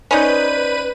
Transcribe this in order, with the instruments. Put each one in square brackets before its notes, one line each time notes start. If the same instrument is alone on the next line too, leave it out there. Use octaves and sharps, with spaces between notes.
[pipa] C#4 D#4 [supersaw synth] B4 D#7 [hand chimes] C5 D5 G6